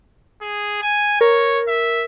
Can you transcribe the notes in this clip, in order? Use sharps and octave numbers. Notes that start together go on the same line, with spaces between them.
G#4
G#5
A#4 C#5
E5